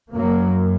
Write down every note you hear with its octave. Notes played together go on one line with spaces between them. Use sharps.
F#2 F#3 A#3